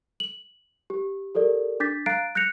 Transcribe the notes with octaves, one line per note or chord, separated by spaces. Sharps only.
F#7
G4
G4 A4 A#4 D5
D4 D6 G6 A6 B6
F5 A#5 F#6 A6 C7 D7
F#6 G6 A#6 C#7 F7